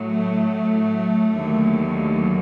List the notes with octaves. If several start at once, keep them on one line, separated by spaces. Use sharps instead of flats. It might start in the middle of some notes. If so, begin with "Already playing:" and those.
Already playing: A2 F#3
A3
D#2 D3 F#3